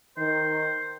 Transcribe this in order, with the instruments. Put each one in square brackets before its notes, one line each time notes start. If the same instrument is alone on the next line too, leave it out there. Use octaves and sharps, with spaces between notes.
[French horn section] D#3 [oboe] C5